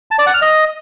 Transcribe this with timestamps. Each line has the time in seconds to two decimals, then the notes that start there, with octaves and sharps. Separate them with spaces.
0.11 A5
0.19 D5
0.26 F#5
0.34 F6
0.42 D#5